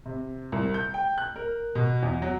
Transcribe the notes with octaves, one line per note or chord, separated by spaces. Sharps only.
C3
C2
G6
G5
F#6
A#4
B2
E2
F#3